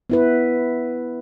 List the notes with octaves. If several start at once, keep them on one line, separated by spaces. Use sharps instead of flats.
B3 E4 B4